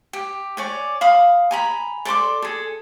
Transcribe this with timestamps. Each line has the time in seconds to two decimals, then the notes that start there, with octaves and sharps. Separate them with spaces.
0.13 G4
0.57 C#5 D5 G#5
1.01 F5 B5 D#6
1.51 G#5 A#5 B5
2.05 A4 D5 C6 D6
2.42 G#4 A4